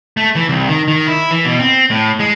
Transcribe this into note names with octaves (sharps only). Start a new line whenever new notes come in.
A3
E3
C2
D#3
D#3
E4
E3
B2
C4
A2
G#3